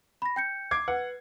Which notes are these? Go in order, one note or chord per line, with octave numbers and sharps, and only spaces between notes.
B5 A#6
G5 G6 C#7
D6 G#6 C7
B4 F#5